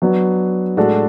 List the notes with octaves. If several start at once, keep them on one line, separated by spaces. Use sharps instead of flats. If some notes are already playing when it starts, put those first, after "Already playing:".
F#3 B3 D4
A2 G#3 D4 F#4 A4